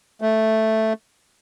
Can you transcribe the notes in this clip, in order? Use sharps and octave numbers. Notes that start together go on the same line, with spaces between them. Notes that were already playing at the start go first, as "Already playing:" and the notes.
A3